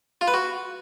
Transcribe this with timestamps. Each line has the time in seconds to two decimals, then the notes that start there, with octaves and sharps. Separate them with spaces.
0.21 F4
0.28 B4
0.34 F#4